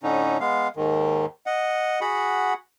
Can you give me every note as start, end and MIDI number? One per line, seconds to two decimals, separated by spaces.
0.03 0.38 45
0.03 0.38 50
0.03 0.38 61
0.03 0.38 63
0.40 0.68 56
0.40 0.68 59
0.40 0.68 77
0.76 1.26 39
0.76 1.26 44
0.76 1.26 51
1.46 2.00 75
1.46 2.00 78
2.01 2.53 66
2.01 2.53 68
2.01 2.53 78
2.01 2.53 83